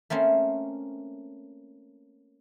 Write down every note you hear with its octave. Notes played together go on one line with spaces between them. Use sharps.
A3 A#3 C4 C#4